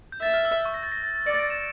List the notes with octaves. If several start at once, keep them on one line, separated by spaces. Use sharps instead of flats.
G6
E5 A6
F6
E6
E6
C#6
A#6
A6
A#6
A6
A6
D5 C#7
D7
E7